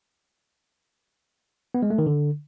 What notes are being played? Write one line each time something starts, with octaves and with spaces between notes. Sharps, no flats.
B3
G#3
A3
D#3
D3